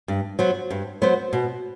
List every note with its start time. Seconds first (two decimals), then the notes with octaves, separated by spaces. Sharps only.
0.08 G2
0.39 F#3 B3 F#4 C5
0.70 G2
1.02 F#3 B3 F#4 C5
1.33 B2